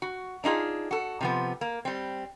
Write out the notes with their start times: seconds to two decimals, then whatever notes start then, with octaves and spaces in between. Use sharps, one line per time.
0.02 F#4
0.44 D4 D#4 F4 G#4
0.91 F#4 A4
1.21 C3 F3 B3
1.61 A#3
1.85 G3 C4